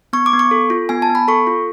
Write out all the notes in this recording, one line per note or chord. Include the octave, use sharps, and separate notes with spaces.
B3 C#6
D6
B3
C#6
A4
F4
B3 G#5
A5
B3
B5
A4 C#6
F4